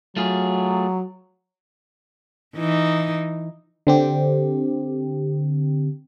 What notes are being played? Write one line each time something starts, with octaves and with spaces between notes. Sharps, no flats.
F#3 A3 F4 G#4
E3 D#4
D3 C4 G4